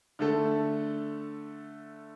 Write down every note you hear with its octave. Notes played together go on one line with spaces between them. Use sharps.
D3 A3 A4